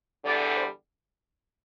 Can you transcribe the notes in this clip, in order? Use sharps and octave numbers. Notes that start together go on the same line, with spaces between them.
E2 D3 G3 D5
C5